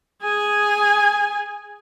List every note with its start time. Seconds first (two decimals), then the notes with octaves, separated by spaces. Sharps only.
0.23 G#4 G#5